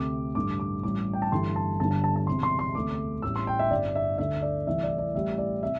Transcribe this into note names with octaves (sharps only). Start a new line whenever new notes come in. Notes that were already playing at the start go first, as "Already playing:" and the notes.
Already playing: D2 C3 A3 D6
A1 G2 D3 A3 D6
D6
A1 G2 G3 D6
G5
A5
G1 G2 E3 A3 C6
A5
G1 G2 D3 A5
A5
A5
A5
E1 E2 C3 E3 C6
C6
C6
D2 C3 A3 D6
A1 A2 G3 E6
C6
G5
E5
G1 G2 G3 D5
E5
D2 D3 A3 E5
D5
C2 C3 E3 A3 E5
D5
D5
A1 A2 G3 E5
D5
C3 E5